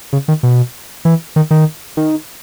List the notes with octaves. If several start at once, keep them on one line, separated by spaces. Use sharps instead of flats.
C#3
D#3
B2
E3
D#3
D#3
D#3